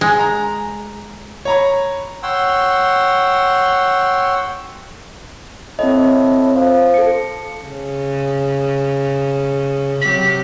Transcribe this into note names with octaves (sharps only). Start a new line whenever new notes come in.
G#3
A#5
C#5 A#5 B5
C#5 F#5 G5 C6 E6
A2 C4 D#5
F3
A4 C#7
C#3
C3 F#3 G4 B6